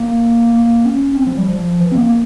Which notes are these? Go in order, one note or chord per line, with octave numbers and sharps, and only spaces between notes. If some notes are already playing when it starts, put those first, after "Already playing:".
Already playing: A#3
A#3
C#4
C#4
C4
F3
G3
F3
E3
C4
A#3